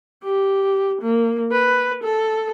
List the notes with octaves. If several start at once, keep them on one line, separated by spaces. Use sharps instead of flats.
G4
A#3
B4
A4